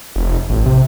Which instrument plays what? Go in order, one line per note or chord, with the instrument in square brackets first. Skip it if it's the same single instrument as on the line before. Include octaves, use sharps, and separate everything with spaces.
[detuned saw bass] F1
A1
C3